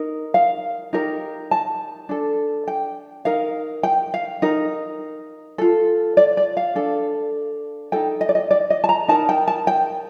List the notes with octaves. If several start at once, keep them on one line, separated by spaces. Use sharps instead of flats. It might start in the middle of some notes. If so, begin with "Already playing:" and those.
Already playing: D#4 A#4
F5
D#4 G4 A#4
A5
D4 A4
G5
D#4 A#4 F5
G5
F5
D#4 A#4
F4 A4
D5
D5
F5
D4 A4
D#4 A4 G5
D#5
D5
D#5
D5
D#5
A5
A#5
D#4 A#4 A5
G5
A5
G5